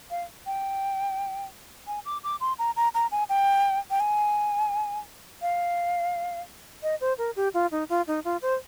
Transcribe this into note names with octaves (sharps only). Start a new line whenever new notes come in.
F5
G5
G#5
D6
D6
C6
A#5
A#5
A#5
G#5
G5
G5
G#5
F5
D#5
C5
A#4
G4
F4
D#4
F4
D#4
F4
C5